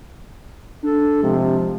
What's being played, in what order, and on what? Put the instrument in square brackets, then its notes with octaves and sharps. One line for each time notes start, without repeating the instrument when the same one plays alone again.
[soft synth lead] D4 [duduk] A4
[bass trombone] C3 [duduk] F3 [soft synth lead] G#3